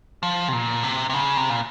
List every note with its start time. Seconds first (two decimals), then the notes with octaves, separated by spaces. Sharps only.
0.23 F3
0.48 C3
0.53 A#2
0.83 C3
1.10 C3
1.14 C#3
1.37 C3
1.50 A#2